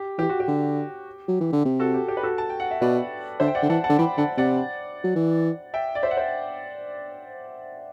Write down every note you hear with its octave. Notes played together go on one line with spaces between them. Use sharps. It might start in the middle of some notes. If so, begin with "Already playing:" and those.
Already playing: G4
E3 G4
F#4
G4
D3
F#3
E3
D3
C3
F#4 A4
G4
G4
B4
F#4 A4
A5
G5
F#5
E5
B2 B4 D5
D3 C5 E5
G5
D5 F#5
D3
E3 F#5 A5
F#5 A5
D3
E3 G5 B5
D3 F#5 A5
C3 D5 F#5
F#3
E3
E5 G5
D5
C5 E5
F#5
C5 E5